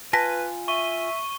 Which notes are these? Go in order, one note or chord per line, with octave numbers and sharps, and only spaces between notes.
F4 B4 G#5 A5 C6 A#6 B6
E5 C#6 D#7 G7